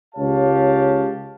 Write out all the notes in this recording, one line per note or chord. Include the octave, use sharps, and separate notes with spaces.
C#2 G4 C#5 F5 A5